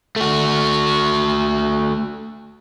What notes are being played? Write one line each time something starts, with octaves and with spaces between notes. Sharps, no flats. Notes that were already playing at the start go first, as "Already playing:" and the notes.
A3 F#4